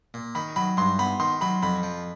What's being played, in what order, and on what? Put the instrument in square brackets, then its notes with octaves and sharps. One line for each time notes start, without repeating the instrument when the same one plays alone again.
[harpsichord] A#2
[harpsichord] D#3 [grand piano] B5
[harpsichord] F#3 [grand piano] B5
[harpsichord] G2 [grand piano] C6
[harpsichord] B3 [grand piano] B5
[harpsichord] D#3 [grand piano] C6
[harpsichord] F#3 [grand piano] B5
[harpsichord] F2 [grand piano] B5
[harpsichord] F3